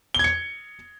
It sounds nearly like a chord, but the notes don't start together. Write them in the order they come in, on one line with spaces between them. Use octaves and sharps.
G7 G#6 C#7